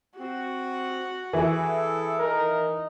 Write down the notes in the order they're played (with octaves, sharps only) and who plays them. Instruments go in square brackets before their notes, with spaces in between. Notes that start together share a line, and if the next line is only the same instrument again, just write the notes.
[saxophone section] C4 [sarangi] F#4
[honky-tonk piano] E3 [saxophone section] E4 G#4 A4
[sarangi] D#4 [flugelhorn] A#4